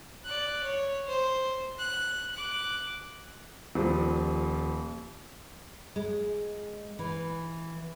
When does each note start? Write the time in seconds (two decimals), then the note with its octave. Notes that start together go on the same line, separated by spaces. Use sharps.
0.25 D5 F#6
0.63 C#5
1.08 C5
1.79 F#6
2.33 D6 F#6
3.75 D#1 F3 G3
5.96 G#3
6.99 E3